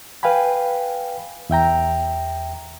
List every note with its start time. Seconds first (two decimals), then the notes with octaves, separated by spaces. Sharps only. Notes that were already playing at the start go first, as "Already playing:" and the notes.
0.23 B4 F5 G5 G#5 B5
1.50 E2 E5 G5 A#5